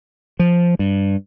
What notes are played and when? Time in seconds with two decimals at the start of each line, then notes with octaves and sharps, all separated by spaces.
0.39 F3
0.79 G2